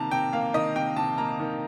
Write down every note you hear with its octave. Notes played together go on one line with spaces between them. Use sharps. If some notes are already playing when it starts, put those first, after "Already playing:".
Already playing: C3 D#3 A#3 A5 A#5
C3 G5
A#3 F5
D#3 D#5
C3 G5
C3 A5
A#3 A#5
D#3